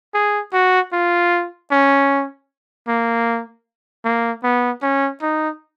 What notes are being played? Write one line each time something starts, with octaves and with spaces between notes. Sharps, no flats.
G#4
F#4
F4
C#4
A#3
A#3
B3
C#4
D#4